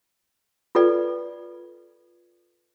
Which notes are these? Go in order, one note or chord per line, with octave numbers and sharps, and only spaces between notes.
F4 A4 B4 D5